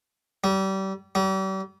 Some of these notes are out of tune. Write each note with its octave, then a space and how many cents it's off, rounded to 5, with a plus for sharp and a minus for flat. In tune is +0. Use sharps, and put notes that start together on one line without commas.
G3 -30
G3 -40